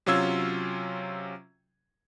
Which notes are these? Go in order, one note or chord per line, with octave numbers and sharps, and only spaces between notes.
C3 F#3 C#4 F4 E6 G#6